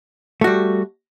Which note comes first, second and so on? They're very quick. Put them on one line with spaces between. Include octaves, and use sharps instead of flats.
A3 F#4 G3